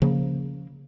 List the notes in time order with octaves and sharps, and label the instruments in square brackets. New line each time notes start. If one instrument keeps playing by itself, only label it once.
[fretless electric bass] C#3 F3 A#3